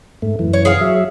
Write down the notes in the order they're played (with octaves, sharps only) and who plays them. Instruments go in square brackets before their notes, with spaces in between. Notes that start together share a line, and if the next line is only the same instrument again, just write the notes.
[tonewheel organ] G#2 A3
F#2 E3
[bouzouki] C#5
G#4 C#5 F5
[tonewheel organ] F#3 E5